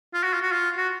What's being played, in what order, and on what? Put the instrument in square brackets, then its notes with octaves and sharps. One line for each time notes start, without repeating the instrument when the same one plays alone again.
[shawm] F4
F#4
F4
F#4
F4
F#4